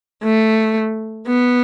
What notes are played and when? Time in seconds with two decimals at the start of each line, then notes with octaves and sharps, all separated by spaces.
0.23 A3
1.27 B3